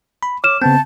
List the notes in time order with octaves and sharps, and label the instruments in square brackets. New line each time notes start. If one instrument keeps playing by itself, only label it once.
[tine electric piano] B5
[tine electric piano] C#5 [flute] D6 [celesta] F6 E7
[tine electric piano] C#3 B3 C4 [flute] A5 [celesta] G6